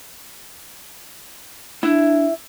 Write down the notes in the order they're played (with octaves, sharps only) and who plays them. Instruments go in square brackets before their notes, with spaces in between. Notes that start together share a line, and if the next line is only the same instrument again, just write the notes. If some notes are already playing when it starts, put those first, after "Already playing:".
[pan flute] D4 [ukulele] E4